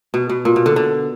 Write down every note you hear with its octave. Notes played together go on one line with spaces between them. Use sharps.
B2
B2
A#2
B2
D3
D3